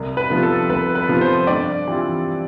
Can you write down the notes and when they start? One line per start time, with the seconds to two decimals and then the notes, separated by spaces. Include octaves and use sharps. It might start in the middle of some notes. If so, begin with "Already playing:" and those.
Already playing: C2
0.17 B4
0.30 C3 F3 B3 F4
0.43 A4
0.69 C2 B4
0.95 B4
1.08 C3 F3 B3 F4
1.21 C5
1.47 G2 D5
1.87 E3 G3 C4 F4